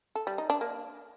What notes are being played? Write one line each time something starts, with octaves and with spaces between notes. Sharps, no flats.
A4
G3
D#4
D4
A#3